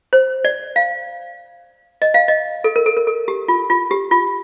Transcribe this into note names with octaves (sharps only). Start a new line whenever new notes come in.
C5
D5
F5
D#5
F5
D#5
A4
A#4
A4
A#4
A4
G4
F4
F4
G4
F4